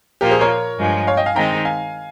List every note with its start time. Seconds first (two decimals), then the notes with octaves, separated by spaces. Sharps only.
0.21 A#2 F3 A#3 F4 G4 A#4
0.31 G#4 C5
0.41 A#4 C#5
0.78 G2 F3 G#3
1.07 C#5 F5
1.17 D#5 G5
1.26 F5 G#5
1.36 D#3 G#3 C4 D#4 G5 A#5
1.65 F5 G#5